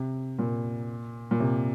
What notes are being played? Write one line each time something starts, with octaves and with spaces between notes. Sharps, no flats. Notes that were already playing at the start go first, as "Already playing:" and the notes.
Already playing: C3
A#2
A#2
C3